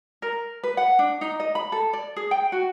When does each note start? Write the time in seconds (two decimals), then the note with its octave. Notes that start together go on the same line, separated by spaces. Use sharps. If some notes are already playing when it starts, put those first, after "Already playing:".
0.22 A#4
0.64 B4
0.77 F#5
0.99 D4
1.21 D#4
1.40 D#5
1.55 B5
1.72 A4
1.93 D5
2.16 G#4
2.31 G5
2.52 F#4